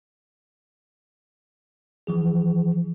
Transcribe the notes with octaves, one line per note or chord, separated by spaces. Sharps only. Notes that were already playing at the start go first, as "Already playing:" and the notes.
E3 F3 G#4